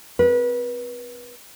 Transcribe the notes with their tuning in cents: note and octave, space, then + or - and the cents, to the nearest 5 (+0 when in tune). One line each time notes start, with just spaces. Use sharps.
C4 -5 B4 -30